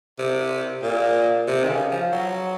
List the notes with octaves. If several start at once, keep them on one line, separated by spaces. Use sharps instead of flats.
C3
A#2
C3
D#3
C#3
F3
F#3